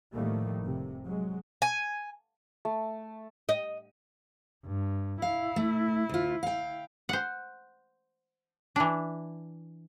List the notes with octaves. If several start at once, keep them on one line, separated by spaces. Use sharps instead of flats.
A2 D#3 F3 G3 A3 A#3
F1 C3
F#3 G#3
G#5
A3
D#5
G2
E4 F5
A3
D2 F4
F5 G5
C5 F#5
E3 D4